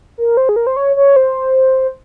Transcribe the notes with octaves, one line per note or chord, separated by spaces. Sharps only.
A#4
C5
G#4
A#4
C5
C#5
C#5
C5